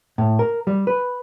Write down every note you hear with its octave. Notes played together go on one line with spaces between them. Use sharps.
A2
A#4
G3
B4